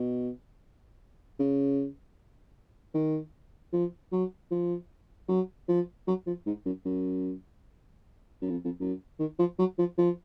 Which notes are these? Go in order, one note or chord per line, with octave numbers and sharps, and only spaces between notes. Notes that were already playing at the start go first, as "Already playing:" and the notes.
Already playing: B2
C#3
D#3
F3
F#3
F3
F#3
F3
F#3
F3
G#2
F#2
F#2
F#2
F2
F2
F#2
D#3
F3
F#3
F3
F3